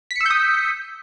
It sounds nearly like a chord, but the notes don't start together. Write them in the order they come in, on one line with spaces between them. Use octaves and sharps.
B6 C#7 E6 G6 D#6